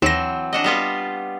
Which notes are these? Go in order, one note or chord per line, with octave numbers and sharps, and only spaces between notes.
D#2 E3 F#3 C4 A#6
D4 F#4 D#5
G3 B3 F4